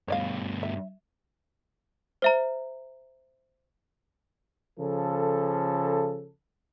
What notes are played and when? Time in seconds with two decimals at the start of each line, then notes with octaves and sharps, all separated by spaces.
0.08 G2 B2 C#5 D5 F5
0.63 E5
2.22 C5 E5 A#5
4.79 C#3 F3 A4